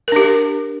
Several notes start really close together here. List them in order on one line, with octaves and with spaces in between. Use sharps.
A#4 D4 G4